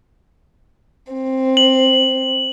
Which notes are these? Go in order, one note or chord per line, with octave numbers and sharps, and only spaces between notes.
C4
F#7